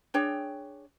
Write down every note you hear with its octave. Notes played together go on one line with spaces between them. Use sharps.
D4 G#4 C#5 G5